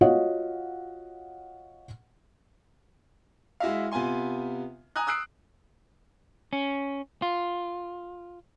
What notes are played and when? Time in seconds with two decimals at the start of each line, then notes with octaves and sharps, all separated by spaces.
0.01 F4 F#4 C#5 D#5 F5 F#5
3.60 G#3 E4 F#4 E5 F5
3.91 C3 B3 F4 G#5 C6
4.96 G#5 A#5 D#6 F#6
5.07 D#6 E6 F#6 C7 D7
6.53 C#4
7.22 F4